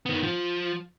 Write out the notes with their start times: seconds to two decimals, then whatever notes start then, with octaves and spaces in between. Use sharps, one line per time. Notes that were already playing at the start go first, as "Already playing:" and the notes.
0.06 D#3 B3
0.23 F3